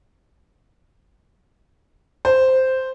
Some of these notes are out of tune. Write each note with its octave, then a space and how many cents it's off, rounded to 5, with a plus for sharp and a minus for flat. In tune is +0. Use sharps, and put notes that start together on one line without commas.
C5 -5